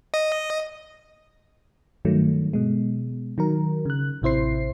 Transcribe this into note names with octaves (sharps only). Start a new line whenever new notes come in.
D#5
G2 D#3 F#3 A3
B2 G#3
D#3 F#3 A#4
C#3 F#6
A1 C3 E4 C5 C7